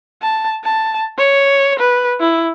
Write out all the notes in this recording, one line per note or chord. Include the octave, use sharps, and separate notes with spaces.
A5
A5
C#5
B4
E4